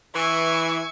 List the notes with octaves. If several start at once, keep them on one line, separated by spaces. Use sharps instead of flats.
E3 E5 G#5 C#6